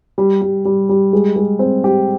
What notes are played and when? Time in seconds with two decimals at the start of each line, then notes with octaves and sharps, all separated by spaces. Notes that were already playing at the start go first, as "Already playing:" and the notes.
0.18 G3
0.41 G3
0.65 G3
0.89 G3
1.13 G#3
1.36 G#3
1.59 C4
1.84 G4